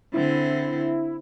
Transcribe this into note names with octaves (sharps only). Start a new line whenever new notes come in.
D3 C4 E4